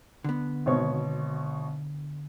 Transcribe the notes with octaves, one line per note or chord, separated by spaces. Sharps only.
D3 B3
G#1 B2 C#5